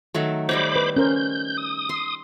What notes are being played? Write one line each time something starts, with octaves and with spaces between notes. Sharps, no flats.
D#3 F#3 A3
G3 D#4 C5 C#5 B5 D6
B4
C#4 A#4 C5 G6
D#6
C6